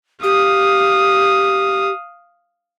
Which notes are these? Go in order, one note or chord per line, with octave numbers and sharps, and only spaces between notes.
G4 F5 D#6